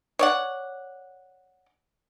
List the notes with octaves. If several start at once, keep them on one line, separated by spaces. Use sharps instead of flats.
C#5 D5 F#5